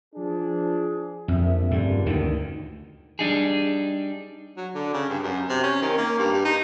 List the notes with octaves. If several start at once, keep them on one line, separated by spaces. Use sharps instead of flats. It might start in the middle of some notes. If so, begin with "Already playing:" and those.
F3 D4 G#4
A#1 F2 D3 E5
C#2 G2 A#2 D3
D2 D#3
G3 D4 D#4 G4 G#4
F#3
D3
C#3
G2
F#2
C3
C#4
D#3
A#3
G2
G2
D#4